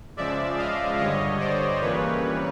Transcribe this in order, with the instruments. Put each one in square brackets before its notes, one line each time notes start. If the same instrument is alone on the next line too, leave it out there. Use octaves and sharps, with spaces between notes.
[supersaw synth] C#3 F3 G#3 D5 E5
D#5 F5
G2 D3 G3 C#5 D#5
C5 D5
F2 C#3 E3 G3 A#3 B4 C#5